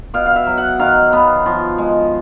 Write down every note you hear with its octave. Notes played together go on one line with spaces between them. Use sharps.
B2 F5
F5
E5
F#3
F#5
D#3 F5
B3
F3
G#3